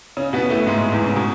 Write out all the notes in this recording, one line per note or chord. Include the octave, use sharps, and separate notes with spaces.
C#3 C#4
B2 B3
A2 A3
G#2 G#3
E2 E3
C#3
B2